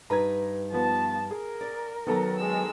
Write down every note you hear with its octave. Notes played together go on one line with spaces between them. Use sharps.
G2 D#4 B4 A#5 G#6
F3 B3 A5
G#4 A#4
D5
D#3 F#3 B3 A4 A#5
G#3 E6